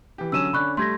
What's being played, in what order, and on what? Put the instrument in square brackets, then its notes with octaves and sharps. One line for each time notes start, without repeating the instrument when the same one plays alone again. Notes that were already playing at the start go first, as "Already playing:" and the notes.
[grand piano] E3 G4
[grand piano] D3 F#3 C#4 [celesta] E6 D#7 E7
[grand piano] D3 C#4 D4 [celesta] B5 C#6 F#6
[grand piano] G3 A3 [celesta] C6 G#6 A#6